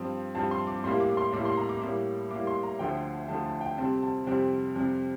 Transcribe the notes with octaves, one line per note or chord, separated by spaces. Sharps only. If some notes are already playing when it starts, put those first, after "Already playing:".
Already playing: G2 F3 C4
G2 F3 C4 A5
C6
D6
A2 G3 A#3 C6
D6
C6
A2 G3 A#3 D6
C6
A#5
D6
A2 G3 A#3 D6
A2 G3 A#3 D6
C6
A#5
D2 D3 F3 A3 G5
D2 D3 F3 A3 A5
A5
G5
F2 C3 G3 C4 A5
A5
F2 C3 G3 C4
F2 C3 G3